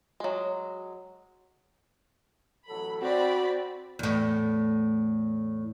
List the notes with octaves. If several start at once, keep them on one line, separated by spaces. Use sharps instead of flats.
F#3 G#3
A1 F#3 A4 B5
C4 F#4 D5 B5
E2 A2